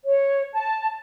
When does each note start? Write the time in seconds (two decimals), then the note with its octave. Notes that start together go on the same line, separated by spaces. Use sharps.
0.04 C#5
0.52 A5